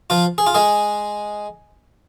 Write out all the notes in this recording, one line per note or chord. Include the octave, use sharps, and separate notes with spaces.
F3 F4
G#4
F4
G#3 G#4